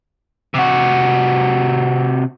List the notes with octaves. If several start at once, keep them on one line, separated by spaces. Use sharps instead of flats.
C3 F#4